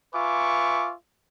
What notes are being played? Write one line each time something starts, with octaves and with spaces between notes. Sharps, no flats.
F4 B4 E5 G#5 C#6 D6